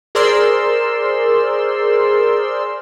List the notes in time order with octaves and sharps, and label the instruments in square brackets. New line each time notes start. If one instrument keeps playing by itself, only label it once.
[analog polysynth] G#4 A#4 C5 D5 C6 E6